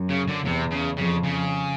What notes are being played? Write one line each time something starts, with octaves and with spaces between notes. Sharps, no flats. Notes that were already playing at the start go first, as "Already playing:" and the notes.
Already playing: F#2
C#3
D3
E2 C3
C#3
F2 C#3
C#3